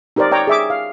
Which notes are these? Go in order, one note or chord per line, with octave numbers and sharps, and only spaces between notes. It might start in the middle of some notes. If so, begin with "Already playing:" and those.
D#4 G4 A#4 C5 D5
C#5 D5 G5 A#5 D6
G#4 E5 D6
F5